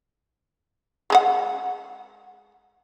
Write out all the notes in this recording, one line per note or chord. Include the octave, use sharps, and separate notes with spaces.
G#3 G#4 F#5